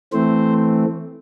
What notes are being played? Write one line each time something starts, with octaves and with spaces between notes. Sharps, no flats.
E3 A3 C4 C5